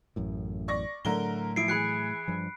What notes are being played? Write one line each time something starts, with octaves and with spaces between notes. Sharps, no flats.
A1 F#2 A2
D5 C#6 A#6
A2 D3 F#3 A3 A#4 G7
F3 E4 C7 D7
E3 G#4 B5 F#6 C#7
G2 F3